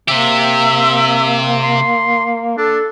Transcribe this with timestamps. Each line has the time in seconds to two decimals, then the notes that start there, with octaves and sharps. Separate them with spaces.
0.09 C3 A#3 G4 E5
1.63 C6
2.57 D4 A4